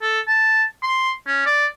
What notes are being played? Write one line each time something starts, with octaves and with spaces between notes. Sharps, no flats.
A4
A5
C6
C#4
D5